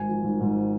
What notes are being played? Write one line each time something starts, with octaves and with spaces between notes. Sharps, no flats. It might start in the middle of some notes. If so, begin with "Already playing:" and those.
Already playing: G#1 G#2 G#5
F3
G#1
G#2